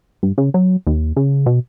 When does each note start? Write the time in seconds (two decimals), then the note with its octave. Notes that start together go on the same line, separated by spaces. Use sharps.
0.23 G2
0.38 C#3
0.54 F#3
0.87 D#2
1.16 C#3
1.46 B2